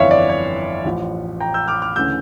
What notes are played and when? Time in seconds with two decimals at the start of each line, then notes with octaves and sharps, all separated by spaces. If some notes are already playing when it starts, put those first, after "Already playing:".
Already playing: G1 F2 E3 C#5 D5 E5 F5
0.11 D5
0.29 C#5
0.85 A1 A2 F3
1.40 G5 A#5
1.54 E6 G6
1.68 D6 F6
1.82 D6 F6
1.96 D2 C#3 E3 A3 C#4 E6 G6